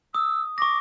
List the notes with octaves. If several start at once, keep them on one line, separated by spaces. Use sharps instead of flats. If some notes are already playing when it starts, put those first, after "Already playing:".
D#6 E6
C#6 D6 A#6